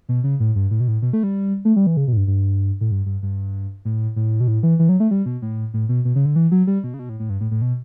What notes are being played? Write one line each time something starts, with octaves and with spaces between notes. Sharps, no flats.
B2
C#3
A2
G2
A2
B2
A2
B2
A3
G3
A3
G3
E3
C#3
B2
A2
G2
G2
A2
G2
G2
G2
A2
A2
B2
A2
E3
E3
F#3
A3
G3
B2
A2
A2
B2
B2
C#3
D3
E3
F#3
G3
B2
C#3
B2
A2
A2
G2
A2
A2
B2